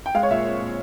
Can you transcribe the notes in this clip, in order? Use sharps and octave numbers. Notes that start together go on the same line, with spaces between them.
G5
G#3 F5
C#5
A#2 E5
C4
A#2